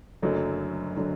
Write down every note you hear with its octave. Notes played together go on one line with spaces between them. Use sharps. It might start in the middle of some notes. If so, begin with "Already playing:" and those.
F#1 F#2 D3 F#3 A3
D3 F#3 A3